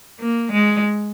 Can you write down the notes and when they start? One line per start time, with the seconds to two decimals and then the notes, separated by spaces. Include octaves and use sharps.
0.20 A#3
0.52 G#3